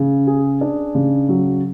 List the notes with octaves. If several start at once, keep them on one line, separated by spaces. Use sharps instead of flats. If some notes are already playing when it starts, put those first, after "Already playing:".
Already playing: C#3
G#4
D4
C#3
F#3